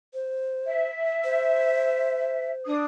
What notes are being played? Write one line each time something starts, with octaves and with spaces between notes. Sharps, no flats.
C5
E5
C5
D4 D#6